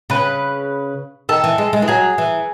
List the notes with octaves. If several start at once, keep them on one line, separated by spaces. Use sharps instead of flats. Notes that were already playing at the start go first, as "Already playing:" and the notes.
C#3 B4
D#3 A4
E3
G#3
G#3
E3
F#3 G#4
E3